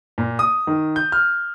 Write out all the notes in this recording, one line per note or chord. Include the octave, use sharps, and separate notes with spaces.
A#2
D#6
D#3
G6
F6